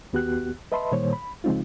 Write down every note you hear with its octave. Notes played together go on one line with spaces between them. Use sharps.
D#2 B3 F#4 G4 F#6
B4 D#5 E5 A5 B5 C6
A#2 D#3 G3 A#3 C5 C#5
B5
C#3 F3 G#3 C4 D#4 F4